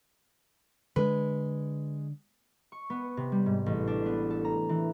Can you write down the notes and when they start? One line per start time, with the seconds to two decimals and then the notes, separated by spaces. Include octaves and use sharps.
0.96 D3 G#3 D4 B4
2.72 C#6
2.90 B3
3.17 C3
3.32 G3
3.46 G#2
3.66 A1
3.88 D4
4.06 B3
4.30 A4
4.45 A#5
4.69 E3